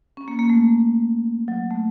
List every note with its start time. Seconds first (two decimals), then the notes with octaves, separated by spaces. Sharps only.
0.17 C#4
0.28 A#3
0.39 A#3
0.50 A3
1.48 F#3
1.70 A3